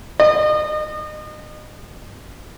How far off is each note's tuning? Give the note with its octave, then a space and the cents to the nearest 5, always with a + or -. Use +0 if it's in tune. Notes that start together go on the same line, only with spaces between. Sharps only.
D#5 -35